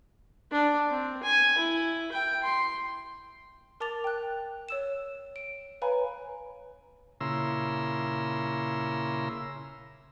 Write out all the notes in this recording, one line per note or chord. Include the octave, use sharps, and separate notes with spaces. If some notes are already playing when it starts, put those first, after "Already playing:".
D4
C4
G#5
E4
G5
C6
A#4 A5 D6 A6 F7
G5 F#6
C#5 E6 E7
D7
B4 C#5 F5 G#5 A#5 B5
A#2 C#3 E4 A#5 C6 E6